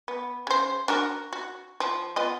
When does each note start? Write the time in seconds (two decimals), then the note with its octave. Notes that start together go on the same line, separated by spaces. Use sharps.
0.08 B3
0.47 C#3 C5
0.88 D4 F#4 A#4
1.33 F#4
1.80 F3
2.16 B3 F4 D#5